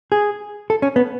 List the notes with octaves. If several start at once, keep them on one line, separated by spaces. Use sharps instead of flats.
G#4
A4
C#4
B3